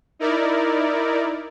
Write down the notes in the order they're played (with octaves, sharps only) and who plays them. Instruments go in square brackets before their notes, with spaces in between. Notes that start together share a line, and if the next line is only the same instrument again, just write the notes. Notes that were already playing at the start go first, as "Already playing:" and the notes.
[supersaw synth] D#4 E4 A#4 D5